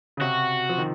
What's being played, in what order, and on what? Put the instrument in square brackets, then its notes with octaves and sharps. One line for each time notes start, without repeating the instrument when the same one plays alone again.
[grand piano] C#3
[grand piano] C3 [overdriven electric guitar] F#4
[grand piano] F3
D#3